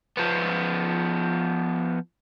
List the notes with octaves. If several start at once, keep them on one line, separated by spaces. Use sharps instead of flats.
F3 B3